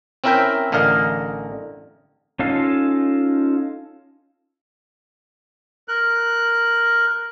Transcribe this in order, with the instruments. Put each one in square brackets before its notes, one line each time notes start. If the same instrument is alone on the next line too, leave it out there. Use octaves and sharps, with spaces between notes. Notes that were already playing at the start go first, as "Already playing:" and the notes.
[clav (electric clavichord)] C4 C#4 E4 A#4 E5 G5
A1 D3 A#4 D#5 F5
[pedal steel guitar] C#4 D#4 F4 A4 F5
[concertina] A#4 F#6